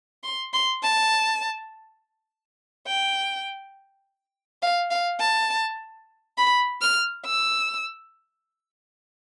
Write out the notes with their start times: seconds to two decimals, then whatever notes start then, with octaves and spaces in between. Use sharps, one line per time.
0.24 C6
0.53 C6
0.83 A5
2.87 G5
4.63 F5
4.91 F5
5.20 A5
6.37 B5
6.82 F6
7.25 E6